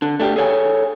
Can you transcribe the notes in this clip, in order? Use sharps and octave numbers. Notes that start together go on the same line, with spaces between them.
D3
A3 D4 G4
G#4 A4 C#5 F#5 G#5